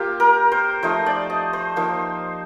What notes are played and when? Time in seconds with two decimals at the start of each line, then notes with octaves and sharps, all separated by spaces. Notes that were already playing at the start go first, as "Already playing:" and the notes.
Already playing: A#3 F4 G4
0.20 A#4
0.52 C5
0.83 F3 A3 D#4 C5
1.06 D5
1.30 D#5
1.53 C5
1.76 F3 A#3 D#4 C5